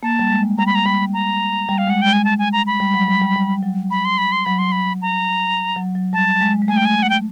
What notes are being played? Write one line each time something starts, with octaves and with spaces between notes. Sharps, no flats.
A#3 A5
G3
G#3
G3 A#5
B5
A#5
G3 B5
A#5
G3
F5
G#3 F#5
G#3 G5
G#5
A5
G#5
A#5
B5
G3
F#3
G3
G3
G3
F#3
B5
C6
B5
C6
F#3 B5
C6
B5
A#5
F#3
F#3
G3 A5
G#3
G#3
A3 G#5
G5
G#5
F#5
G5